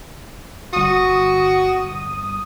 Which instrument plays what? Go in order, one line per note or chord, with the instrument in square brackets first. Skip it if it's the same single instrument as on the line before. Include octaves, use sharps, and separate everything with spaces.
[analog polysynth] G1 D#6 [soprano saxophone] F#4